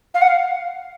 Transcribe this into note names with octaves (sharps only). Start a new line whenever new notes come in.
F5
F#5
F5